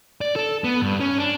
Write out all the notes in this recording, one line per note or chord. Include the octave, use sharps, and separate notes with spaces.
D5
A4
B3
G2
C#4
D4